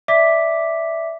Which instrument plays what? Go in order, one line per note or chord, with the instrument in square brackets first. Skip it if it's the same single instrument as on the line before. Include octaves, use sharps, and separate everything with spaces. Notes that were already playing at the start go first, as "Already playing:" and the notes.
[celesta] D5 E5 D6 B6